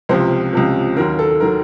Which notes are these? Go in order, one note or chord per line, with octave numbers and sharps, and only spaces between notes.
C#2 C3 F3 C5
C#2 C3 F3
D#2 D#3 F#3 A#4
A4
D#3 F#3 A#4